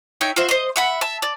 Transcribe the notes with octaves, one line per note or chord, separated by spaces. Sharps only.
D#4 C#5 E5 G5
F4 F#4 C5 E5
C5 D#5
E5 F#5 B5
E5 A5
D5